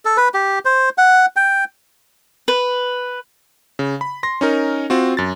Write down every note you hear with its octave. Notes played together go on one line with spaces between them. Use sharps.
A4
B4
G4
C5
F#5
G5
B4
C#3
B5
C6 A#6
C#4 D#4 A#4
C4 F4 F#4
F#2 A6